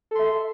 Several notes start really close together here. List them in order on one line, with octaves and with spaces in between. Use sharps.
A4 C6 E5